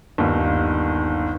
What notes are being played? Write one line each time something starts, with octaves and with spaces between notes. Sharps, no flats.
G1 D#2